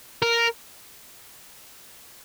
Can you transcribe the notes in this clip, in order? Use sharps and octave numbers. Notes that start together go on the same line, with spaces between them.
A#4